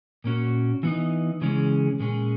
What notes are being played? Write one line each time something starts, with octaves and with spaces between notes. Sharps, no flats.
A#2 A#3 C#4 F#4
E3 B3 D#4
C#3 E3 G#3 C#4 G#4
A#2 G#3 C#4 G#4